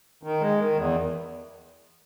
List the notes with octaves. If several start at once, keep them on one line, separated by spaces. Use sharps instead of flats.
D#3
G#3
D#3
E2